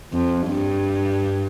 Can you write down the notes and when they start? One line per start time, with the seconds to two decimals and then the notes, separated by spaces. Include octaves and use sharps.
0.13 F2
0.48 G2